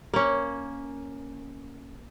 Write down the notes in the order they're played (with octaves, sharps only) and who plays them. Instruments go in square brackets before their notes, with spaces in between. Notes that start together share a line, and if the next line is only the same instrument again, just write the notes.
[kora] A#3 C#4